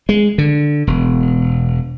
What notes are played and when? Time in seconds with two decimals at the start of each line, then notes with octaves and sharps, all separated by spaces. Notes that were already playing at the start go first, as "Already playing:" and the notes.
0.09 G#3
0.38 D3
0.87 E1